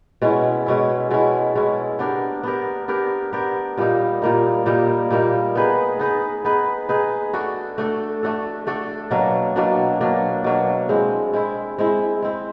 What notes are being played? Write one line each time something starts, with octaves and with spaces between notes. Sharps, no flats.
B2 G#3 C#4 E4
B2 G#3 C#4 E4
B2 G#3 C#4 E4
B2 G#3 C#4 E4
B3 D4 G4 A#4
B3 D4 G4 A#4
B3 D4 G4 A#4
B3 D4 G4 A#4
A#2 G3 A#3 D#4
A#2 G3 A#3 D#4
A#2 G3 A#3 D#4
A#2 G3 A#3 D#4
B3 D#4 G#4 B4
B3 D#4 G#4 B4
B3 D#4 G#4 B4
B3 D#4 G#4 B4
A3 D4 F#4 A4
A3 D4 F#4 A4
A3 D4 F#4 A4
A3 D4 F#4 A4
B2 F#3 A#3 D4
B2 F#3 A#3 D4
B2 F#3 A#3 D4
B2 F#3 A#3 D4
G#3 C4 E4
G#3 C4 E4
G#3 C4 E4
G#3 C4 E4